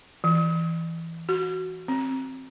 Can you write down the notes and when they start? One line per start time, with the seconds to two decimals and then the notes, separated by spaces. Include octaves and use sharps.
0.24 E3
1.29 F#4
1.88 C4